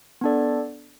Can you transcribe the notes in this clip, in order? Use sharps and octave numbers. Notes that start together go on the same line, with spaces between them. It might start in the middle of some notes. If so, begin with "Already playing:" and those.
B3 D4 A4 D5